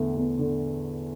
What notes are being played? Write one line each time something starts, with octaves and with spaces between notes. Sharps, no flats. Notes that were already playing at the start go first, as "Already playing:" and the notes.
Already playing: E2 D3 A3
E2
D3